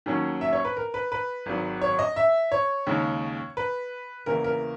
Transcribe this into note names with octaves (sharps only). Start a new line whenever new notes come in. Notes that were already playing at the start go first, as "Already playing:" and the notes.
D#2 D#3 F#3 C#4
E5
C#5
B4
A#4
B4
B4
G#1 G#2 D#3 F#3
C#5
D#5
E5
C#5
D#2 C#3 G#3 C#4
B4
E2 C#3 E3 A#3 A#4
A#4